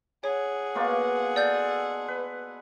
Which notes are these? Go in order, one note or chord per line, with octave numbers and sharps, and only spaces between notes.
G#4 C#5 F#5
B2 A#3 F4
A4 D5 G6
B4